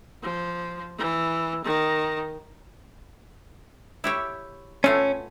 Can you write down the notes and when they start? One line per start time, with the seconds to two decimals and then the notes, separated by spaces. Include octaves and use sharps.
0.23 F3
0.98 E3
1.64 D#3
4.04 E4 G4 C#5
4.84 B2 A3 C#4 F4